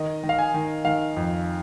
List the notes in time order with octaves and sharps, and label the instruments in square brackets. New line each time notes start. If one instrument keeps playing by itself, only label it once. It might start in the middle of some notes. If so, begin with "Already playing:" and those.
Already playing: [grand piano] D#3 D#5
D#3
F5
G#5
D#3
D#3 F5
F2